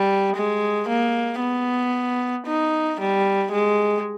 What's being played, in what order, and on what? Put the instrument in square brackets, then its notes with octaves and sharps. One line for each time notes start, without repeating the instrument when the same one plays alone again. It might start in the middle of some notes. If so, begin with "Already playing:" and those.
Already playing: [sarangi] G3
G#3
A#3
B3
D#4
G3
G#3